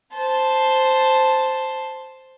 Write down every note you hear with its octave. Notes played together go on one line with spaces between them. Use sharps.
C5 A5